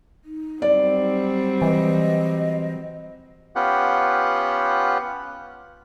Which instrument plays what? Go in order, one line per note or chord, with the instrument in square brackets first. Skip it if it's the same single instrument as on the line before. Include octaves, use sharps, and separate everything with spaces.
[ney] D#4
[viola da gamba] F#3 G3 C4 [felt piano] D5
[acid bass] E3 [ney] D#5
[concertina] B3 C#4 F4 G4 F#5